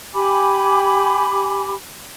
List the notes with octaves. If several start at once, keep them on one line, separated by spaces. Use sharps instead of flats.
G4 G#5 B5 D6